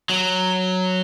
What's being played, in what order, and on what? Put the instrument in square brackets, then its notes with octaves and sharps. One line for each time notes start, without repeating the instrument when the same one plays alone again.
[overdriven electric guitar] F#3